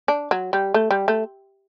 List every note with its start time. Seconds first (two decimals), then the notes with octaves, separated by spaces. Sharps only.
0.08 D4
0.31 F#3
0.53 G3
0.74 A3
0.91 G3
1.08 A3